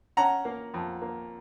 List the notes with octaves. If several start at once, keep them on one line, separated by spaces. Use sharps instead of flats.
C#4 F#5 A#5
A#3
F2
A#3